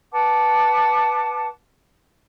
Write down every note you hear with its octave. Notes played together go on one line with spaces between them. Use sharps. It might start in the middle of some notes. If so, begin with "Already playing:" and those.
B4 F#5 A5 D6